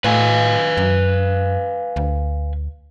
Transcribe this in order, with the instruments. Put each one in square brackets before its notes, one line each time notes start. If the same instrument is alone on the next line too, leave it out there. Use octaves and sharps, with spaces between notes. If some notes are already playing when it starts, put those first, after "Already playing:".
[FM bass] A2 [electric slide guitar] B4 F5 G#5
[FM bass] F#2
D2